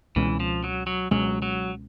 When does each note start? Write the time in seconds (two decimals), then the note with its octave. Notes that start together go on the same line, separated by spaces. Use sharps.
0.16 C#2 B2 E3 G#3 C#4
0.40 F3
0.64 F#3
0.87 F#3
1.11 C#2 B2 F#3 G#3 C#4
1.42 F#3